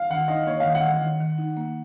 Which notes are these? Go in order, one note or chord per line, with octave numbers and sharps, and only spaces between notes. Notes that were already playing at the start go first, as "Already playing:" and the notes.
Already playing: F5
D#3 F#5
D#4 D#5
A#3 C#5
D#3 F5
F#5
D#3
F#5
D#3
D#3
D#4
A#3